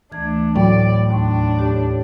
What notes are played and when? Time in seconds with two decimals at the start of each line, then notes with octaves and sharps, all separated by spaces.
0.12 D2 E3 A3 D4 G#6
0.56 A2 F#3 D5 G5
1.10 D#2 D4 C6 C#6
1.59 G4 C#5